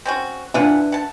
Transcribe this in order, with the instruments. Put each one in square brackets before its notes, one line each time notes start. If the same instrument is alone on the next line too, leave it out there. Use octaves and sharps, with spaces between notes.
[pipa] C4 C#4 F#4
[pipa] E3 F4 F#5 [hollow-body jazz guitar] D4 B4 E5
[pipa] F#5 A5